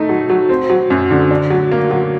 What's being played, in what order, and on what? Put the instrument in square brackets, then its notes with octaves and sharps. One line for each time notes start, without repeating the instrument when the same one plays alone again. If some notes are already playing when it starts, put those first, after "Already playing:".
Already playing: [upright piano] A3 D#4
F#3
F#3
C4
F#3
F#2
D3
D4
F#3
A#3
F#3